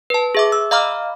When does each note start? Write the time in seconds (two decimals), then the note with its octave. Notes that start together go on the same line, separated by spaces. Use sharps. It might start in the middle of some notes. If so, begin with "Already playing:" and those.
0.10 B4 A5
0.35 G#4 E5 D6
0.52 E6
0.71 D#5 F5 A#5 B5 D6 F6